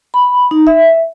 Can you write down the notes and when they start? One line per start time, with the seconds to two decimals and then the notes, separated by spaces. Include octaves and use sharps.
0.14 B5
0.51 D#4
0.67 E5